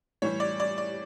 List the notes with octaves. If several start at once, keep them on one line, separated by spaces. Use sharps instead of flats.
A2 E3 G3 C#5
D5
D5
D5